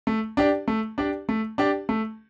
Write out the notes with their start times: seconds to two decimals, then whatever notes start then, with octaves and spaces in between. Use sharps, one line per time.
0.07 A3
0.37 D4 G4 D5
0.68 A3
0.98 D4 G4 D5
1.29 A3
1.58 D4 G4 D5
1.89 A3